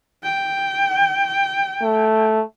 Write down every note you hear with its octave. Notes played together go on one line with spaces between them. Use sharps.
G5
A3